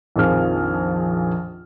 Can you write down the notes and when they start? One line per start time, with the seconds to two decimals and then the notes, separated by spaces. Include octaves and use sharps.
0.16 A#1 F2 D#3 F3 G#4 F6